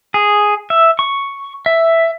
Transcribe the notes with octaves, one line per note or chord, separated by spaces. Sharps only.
G#4
E5
C#6
E5